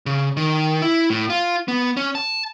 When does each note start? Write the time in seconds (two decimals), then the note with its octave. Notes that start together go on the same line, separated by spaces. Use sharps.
0.06 C#3
0.37 D#3
0.82 E4
1.10 A2
1.30 F4
1.68 B3
1.97 C#4
2.15 A5